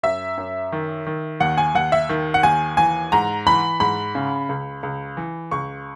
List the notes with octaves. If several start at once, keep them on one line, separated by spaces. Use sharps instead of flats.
F#2 E5
F#2
D#3
D#3
D#2 F#5
G#5
D#2 F#5
E5
D#3
F#5
D#2 G#5
E3 G#5
G#2 A#5
E3 B5
G#2 B5
C#3
C#2
C#2
E3
C#2 C#6